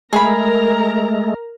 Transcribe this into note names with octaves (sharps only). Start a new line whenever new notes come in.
G#3 A3 G#4 A#4 A#5 B5